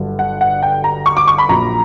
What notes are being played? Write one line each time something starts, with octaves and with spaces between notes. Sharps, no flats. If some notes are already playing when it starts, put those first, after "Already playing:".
Already playing: G1 G2 D3 F#3
F#5
F#5
G5
A#5
C#6
D6
C#6
B5
A#1 A#2 F#3 A#5